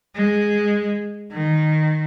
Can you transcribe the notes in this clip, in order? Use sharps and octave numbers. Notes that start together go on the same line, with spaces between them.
G#3
D#3